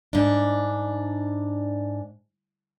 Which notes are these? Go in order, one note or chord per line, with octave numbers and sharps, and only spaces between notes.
G#2 D4